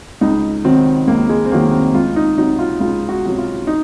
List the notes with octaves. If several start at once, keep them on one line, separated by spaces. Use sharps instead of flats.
C#2 D#4
C3 D#3 F#3 C4
C#2 A#3
G#3
C4
C3 D#3 F#3 A#3
C4
C#2 F4
D#4
C3 F#3 D#4
F4
C#2 F4
F#4
C3 F#3
F4
D#4